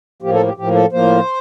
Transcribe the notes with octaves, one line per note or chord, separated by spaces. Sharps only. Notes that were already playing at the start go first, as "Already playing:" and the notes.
A2 F3 A#3 G4
A4
G4
A2 F3 A#3 G4
A4
A2 F3 A#3 C5